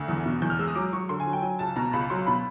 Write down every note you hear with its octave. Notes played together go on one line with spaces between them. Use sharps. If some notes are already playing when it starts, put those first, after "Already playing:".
Already playing: D2
E2
B2
E2 G6
F6
G#3 E6
D#6
F#3 D6
F#3 C#6
D3 C6
G#5
F#3
G5
F#3 G#5
C#2 A5
B2 A#5
C#2 B5
F#3 C6
B2 B5